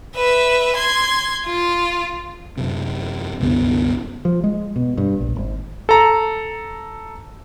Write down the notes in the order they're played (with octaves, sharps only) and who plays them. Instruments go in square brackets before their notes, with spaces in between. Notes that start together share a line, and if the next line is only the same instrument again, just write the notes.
[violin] B4 E5
C6 G#6
F4
[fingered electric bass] F#2 C3
C2 F#2 D3 B3
F3
G#3
B2
G2
A#1
G#1
[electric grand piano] A4 A#5